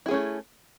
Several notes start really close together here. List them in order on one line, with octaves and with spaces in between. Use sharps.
E4 G#4 C#4 A3